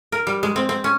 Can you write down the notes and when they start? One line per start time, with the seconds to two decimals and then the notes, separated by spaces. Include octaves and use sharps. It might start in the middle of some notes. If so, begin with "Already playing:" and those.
0.12 A#4
0.27 G3
0.43 G#3
0.56 C4
0.69 C4
0.84 C#4